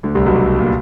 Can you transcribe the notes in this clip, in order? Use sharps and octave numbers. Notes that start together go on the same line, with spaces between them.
D2 D3
C2 C3
B1 B2
A#2